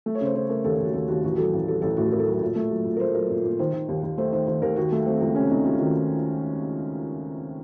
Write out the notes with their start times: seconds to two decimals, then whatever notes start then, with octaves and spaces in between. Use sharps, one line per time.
0.06 A3
0.15 C#5
0.21 C#3 C5
0.35 C#3 C5
0.49 A3 A#4
0.64 D#2 A4
0.80 D#2
0.85 F#4
0.93 D#2 A4
1.08 D#2 F#4
1.23 A1 F#4
1.38 F#3 A4
1.54 A1
1.68 F#3 A4
1.82 A1 A4
1.97 A2 F#4
2.12 A2 A#4
2.19 A4
2.26 F#3 F#4
2.33 A4
2.42 A#2
2.56 A3
2.71 F#3
2.86 A#2
2.97 A#4
3.00 A3 C5
3.14 F#3 A#4
3.30 A#2
3.44 A#2
3.59 D#3 C5
3.73 D#3
3.88 D#2
4.03 D#2
4.18 A3 C5
4.32 D#3 C5
4.47 D#3 C5
4.61 D#2 A#4
4.76 D#3 F#4
4.92 A3
5.06 A3 C4
5.21 C#2 C4
5.36 C3 C#4
5.51 A3 D#4
5.65 A3 F4
5.79 D#3 F#4